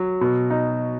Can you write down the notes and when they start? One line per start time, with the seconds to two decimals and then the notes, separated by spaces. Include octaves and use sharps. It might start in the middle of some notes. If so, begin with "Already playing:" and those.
Already playing: F#3
0.21 B2
0.50 D#4